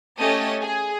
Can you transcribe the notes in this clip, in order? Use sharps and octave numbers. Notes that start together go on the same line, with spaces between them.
A3 C#4 G4 D#5 A5 D#6
G#4